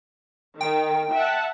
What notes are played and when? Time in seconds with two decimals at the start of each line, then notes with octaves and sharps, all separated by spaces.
0.61 D#3 G5
1.14 E5 F#5 A5